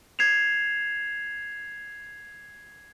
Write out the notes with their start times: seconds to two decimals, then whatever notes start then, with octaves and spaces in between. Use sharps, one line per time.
0.19 G#6 C7 E7 F7